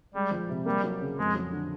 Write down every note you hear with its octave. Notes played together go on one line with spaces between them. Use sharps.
G3 G#3
F3
C3
G3 A#3
F#3
C#3
F2 G#3
F#3
D3